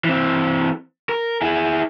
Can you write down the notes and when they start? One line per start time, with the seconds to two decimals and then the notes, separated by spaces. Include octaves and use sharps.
0.05 E3 C4
1.09 A#4
1.41 E4 G#4